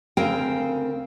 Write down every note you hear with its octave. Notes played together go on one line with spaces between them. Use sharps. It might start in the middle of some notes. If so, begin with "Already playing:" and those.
D2 C#3 C4 A#4 G5 G#5